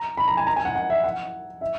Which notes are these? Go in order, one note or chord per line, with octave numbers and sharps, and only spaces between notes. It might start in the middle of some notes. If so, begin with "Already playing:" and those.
Already playing: A#5
B5
A#5
G#5
A#5
G#5
F#5
F#5
E5
F#5
E5